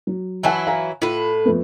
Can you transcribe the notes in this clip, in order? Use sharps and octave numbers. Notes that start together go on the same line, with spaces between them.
F#3
E3 F#3 E4 F#5 G#5 A5
F5 G#5 A#5
A2 F4 B4
F2 A3 B3